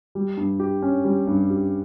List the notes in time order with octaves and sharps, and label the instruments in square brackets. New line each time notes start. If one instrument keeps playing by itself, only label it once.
[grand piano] G3
G2
G4
C#4
G3
G2
G4